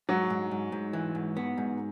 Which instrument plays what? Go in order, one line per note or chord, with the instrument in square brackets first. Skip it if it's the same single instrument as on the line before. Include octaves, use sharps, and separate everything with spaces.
[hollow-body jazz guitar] G#2 [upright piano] F#3 F#4
[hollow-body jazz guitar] G#2
G#2
G#2
E3
G#2
B3
G#2